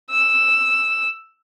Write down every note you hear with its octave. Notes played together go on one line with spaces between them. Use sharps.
E6